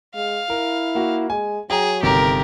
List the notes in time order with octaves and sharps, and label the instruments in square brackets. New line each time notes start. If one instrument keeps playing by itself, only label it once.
[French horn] G#3 [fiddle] F5
[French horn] E4 [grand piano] A#4
[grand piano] A#3 F#4
[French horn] G#3 [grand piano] G#5
[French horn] F#3 [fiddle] G#4 [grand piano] G5 A#5
[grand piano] G1 C3 D#3 [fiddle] G4 A#4